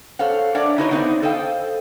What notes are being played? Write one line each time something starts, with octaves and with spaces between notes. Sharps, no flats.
A4 C5 C#5 F5 F#5
D4 A#4 C#5 D5 E5 F#5
D#4 E4 F#4 B4 C#5 D#5
B3 C4 D#4 C5 D5 E5
A4 C5 D#5 F5 G5